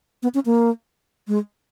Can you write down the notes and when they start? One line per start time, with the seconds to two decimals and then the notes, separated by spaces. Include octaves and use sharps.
0.23 B3
0.34 C#4
0.46 A#3
1.28 G#3